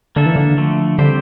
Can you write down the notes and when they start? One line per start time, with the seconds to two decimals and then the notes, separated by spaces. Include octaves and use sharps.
0.16 D3 A#3 D4 A4 E5
0.26 E3
0.36 D3
0.57 D3 F3 A3
0.98 D3 G3 C4 G4 C5